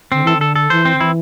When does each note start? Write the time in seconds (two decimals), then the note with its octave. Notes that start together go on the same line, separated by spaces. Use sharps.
0.12 D3 C4
0.24 E3 A4
0.37 D3 A4
0.56 A4
0.70 E3 C5
0.85 C4
0.95 D3
1.00 E3 E4